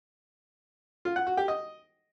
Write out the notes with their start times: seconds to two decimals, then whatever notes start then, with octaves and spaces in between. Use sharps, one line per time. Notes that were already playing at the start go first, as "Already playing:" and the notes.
1.05 F4
1.16 F#5
1.27 F#4
1.37 G4
1.48 D#5